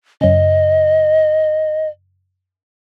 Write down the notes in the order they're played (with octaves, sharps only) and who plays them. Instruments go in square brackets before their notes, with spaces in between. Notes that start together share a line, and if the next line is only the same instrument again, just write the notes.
[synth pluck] F#2 C#3 [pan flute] D#5